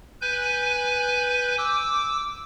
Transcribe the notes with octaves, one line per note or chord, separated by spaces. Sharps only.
B4 G#5 G6
D6 E6